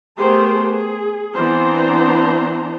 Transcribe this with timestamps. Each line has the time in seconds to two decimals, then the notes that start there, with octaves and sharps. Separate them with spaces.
0.17 A3 B3 G4 G#4 A#4 C5
0.70 G#4
1.34 E3 B3 C4 D4 C5 A#5